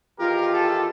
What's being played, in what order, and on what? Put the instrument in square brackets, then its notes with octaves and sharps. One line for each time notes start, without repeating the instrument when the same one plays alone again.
[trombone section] E2 D#3 G4 [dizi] F4 [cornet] A#4
[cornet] A4